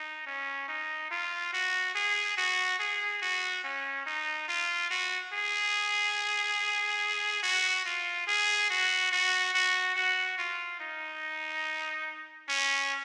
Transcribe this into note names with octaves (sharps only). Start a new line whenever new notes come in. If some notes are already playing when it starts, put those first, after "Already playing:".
Already playing: D#4
C#4
D#4
F4
F#4
G#4
F#4
G#4
F#4
C#4
D#4
F4
F#4
G#4
F#4
F4
G#4
F#4
F#4
F#4
F#4
F4
D#4
C#4